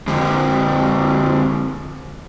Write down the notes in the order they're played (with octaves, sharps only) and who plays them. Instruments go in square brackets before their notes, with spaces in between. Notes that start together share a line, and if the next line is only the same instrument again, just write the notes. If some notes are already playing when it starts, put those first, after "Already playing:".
[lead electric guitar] F2 D3